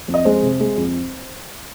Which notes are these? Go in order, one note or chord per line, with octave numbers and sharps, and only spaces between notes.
F2
D#5
G#3 C5
C3
G#3
F2